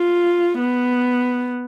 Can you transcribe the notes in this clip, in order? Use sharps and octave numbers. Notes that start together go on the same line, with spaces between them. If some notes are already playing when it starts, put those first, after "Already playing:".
Already playing: F4
B3